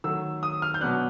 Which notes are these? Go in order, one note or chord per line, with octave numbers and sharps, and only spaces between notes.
D#3 F#3 A3 E6
D#6
F6
G6
B2 F#3 B3 D4 F#6